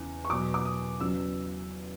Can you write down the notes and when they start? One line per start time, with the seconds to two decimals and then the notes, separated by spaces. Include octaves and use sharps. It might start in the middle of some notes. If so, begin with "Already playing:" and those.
Already playing: E2 C#3 E3
0.25 C#6
0.29 E2 B2 F#3 D6
0.54 D6
0.65 D#6
1.00 E2 C#3 F#3 E6